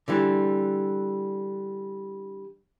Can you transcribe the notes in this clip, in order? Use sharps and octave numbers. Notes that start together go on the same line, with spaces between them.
D3 E3 G3